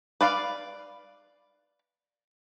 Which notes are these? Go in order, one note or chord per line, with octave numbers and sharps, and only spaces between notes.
B4 D5 F5